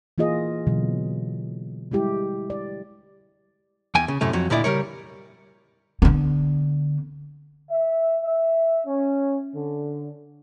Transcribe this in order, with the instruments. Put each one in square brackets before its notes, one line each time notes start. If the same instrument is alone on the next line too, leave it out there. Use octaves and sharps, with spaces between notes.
[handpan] E3 A#3 F4 G#4 D#5
B2 D3 E3 F#3
G3 G#3 E4 G4
D5
[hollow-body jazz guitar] E2 G5 G#5
C#3
F#2 A2 C3 A3 C#4
F2 F#3
D2 A#2 D3 E4 D5 D#5
C#3 G3 A#4 C#5
[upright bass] D3 B3
[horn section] E5
E5
C#4
D3